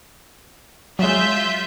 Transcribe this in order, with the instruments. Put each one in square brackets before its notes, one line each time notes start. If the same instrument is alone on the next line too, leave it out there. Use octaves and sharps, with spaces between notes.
[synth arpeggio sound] F#3 G#3 [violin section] F4 E5 G6